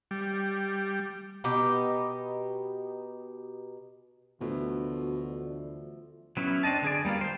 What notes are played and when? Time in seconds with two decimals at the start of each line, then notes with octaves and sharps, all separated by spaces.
0.11 G3
1.44 B2 D#4 G4
4.41 D2 B2 D3 E3 F3 A3
6.37 F#3 B3 C#4 E4
6.63 C4 D4 D#5 A5
6.82 D3 G#4 D5
7.05 G3 A#3 B3 F4
7.21 C5 G5